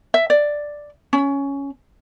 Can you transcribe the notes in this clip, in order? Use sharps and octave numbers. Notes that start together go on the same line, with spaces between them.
E5
D5
C#4